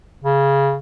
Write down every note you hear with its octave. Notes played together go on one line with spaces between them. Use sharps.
C#3